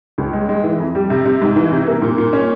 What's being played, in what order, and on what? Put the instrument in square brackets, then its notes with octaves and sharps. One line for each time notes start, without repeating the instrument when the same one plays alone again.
[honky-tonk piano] C#2
G#3
G#3
E3
F2
G3
C3
C3
G#2
E3
C3
A#3
A#2
A#2
C#4